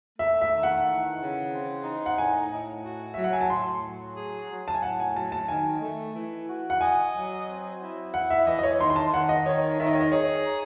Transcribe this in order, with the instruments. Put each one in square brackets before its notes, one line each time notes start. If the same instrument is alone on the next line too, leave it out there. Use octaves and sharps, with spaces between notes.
[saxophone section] A3 [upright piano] E5
[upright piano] E5
[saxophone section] D#3
[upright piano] F#5
[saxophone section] E3
C#3
C4
D#4
[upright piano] F#5
[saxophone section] A2 [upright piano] G#5
[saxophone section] A2
F#4
[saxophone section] F#3 [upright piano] E5
[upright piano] F#5
G#5
A5
[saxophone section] A2 [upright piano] C6
[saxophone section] F#3
G#4
F#3
[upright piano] A5
G#5
[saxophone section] A2 [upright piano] F#5
[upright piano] G#5
[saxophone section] F#3 [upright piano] A5
[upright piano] A5
[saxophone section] D#3 [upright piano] G#5
[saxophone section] A3
E3
F#4
[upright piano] F#5
[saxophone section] D#5 [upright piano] G#5
[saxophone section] F#3
C4
E4
[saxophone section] E3 [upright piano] F#5
[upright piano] E5
[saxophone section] E3 [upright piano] D#5
[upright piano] D#5
C#5
[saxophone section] D#3 [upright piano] C6
[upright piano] C6
A5
[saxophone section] D#3 [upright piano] F#5
[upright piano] D#5
[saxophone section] D#3 [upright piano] C#5
[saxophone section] D#3 [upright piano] E5
[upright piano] D#5
C#5
D#5
[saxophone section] G#4 [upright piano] C#5
[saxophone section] D#4